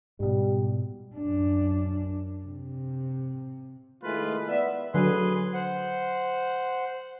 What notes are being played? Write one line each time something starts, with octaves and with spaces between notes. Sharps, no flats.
G#2 B2 G3
F#2 D4
C3
D#3 G#3 A3 E4 F4 B4
B3 D5 E5
D3 F#3 G#4 B4 C6
C5 F#5